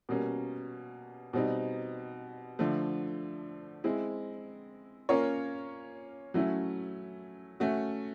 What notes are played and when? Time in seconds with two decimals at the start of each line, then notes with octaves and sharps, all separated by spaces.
0.09 B2 G3 A#3 C#4
1.33 B2 G3 C4 D#4
2.59 D3 F3 A3
3.84 G#3 C4 E4
5.09 A#3 C#4 F4 A#4 C#5
6.34 F#3 A3 C#4 E4
7.60 A3 C#4 F#4